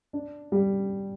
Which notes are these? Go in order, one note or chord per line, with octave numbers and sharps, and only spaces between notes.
D4
G3